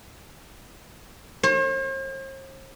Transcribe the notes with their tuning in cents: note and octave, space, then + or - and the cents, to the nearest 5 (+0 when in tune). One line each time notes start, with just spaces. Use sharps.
C5 +45